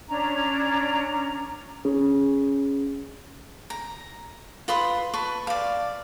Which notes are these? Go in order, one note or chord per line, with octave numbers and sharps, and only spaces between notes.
C#4 D4 A#5
C#4 G#4
A#5
F4 B4 C6 D#6
B4 A5 C#6
D5 F5